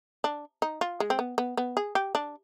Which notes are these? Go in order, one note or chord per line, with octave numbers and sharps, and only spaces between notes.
D4
D#4
F4
G#3
C4
B3
B3
B3
G#4
G4
D4